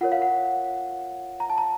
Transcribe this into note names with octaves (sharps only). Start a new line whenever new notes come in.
F4 A#4 C#5 F#5
F5
F#5
A#5
A5
A#5